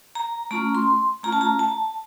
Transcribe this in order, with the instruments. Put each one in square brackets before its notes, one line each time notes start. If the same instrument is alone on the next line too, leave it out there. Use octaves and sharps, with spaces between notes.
[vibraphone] A#5
A3 C#4 F4 A#5
C6
A3 C#4 F4 A#5
A5
A#5
A5